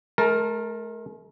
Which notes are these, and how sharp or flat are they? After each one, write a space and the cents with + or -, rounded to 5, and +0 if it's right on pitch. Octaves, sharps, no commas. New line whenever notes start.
A3 -45 A#4 +0 A5 +10